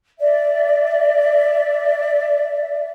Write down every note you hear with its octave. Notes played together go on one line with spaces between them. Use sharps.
D5 E5